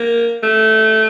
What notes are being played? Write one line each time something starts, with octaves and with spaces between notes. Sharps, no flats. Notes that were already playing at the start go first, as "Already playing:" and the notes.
Already playing: A#3
A3